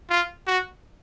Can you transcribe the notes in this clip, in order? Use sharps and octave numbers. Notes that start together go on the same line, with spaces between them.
F4
F#4